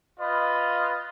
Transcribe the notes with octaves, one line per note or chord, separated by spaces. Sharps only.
F4 B4 D#5